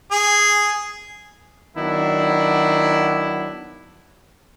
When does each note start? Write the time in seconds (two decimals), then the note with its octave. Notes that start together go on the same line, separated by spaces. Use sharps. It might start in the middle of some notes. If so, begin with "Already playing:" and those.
0.12 G#4
1.77 D#3 F#3 B3 D4 E4